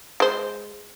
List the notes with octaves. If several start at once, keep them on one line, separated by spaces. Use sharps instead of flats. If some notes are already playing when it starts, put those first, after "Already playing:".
G#3 C5